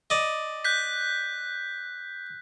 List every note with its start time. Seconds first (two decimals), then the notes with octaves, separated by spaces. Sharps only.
0.10 D5 D#5
0.64 F#6 G6 B6